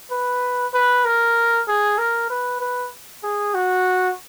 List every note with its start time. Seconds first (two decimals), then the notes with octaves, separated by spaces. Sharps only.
0.11 B4
0.74 B4
1.05 A#4
1.68 G#4
1.98 A#4
2.30 B4
2.61 B4
3.24 G#4
3.55 F#4